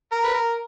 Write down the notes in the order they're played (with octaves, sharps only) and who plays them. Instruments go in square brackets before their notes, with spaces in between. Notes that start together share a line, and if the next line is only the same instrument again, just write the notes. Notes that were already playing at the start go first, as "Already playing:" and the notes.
[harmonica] A#4
B4
A#4